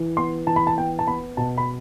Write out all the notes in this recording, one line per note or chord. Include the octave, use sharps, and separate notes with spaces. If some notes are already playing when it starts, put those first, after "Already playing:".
Already playing: E3
B3 C6
E3 A5
B5
A5
B3 G5
A5
B3 B5
B2 A5
B5